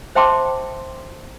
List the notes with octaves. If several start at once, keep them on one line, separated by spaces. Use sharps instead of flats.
C5 E5 G5 A5 C6 D6